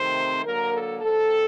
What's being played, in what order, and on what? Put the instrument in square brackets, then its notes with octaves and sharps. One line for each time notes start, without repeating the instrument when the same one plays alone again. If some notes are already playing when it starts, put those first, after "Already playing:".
Already playing: [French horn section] C3 D#3 A3 C4 C5
D3 F#3 A#3 A#4
A4
C3 G3 C4 A4